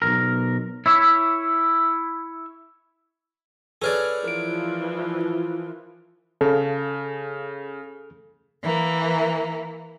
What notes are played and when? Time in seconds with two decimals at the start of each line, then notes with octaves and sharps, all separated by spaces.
0.02 B1 G2 A#4
0.86 E4 C#5 E5
3.82 C#4 G#4 A4 B4 D5 F6
4.24 E3 F3 F4 A#4 D7
6.41 C#3 A4 F5
8.62 E3 A#3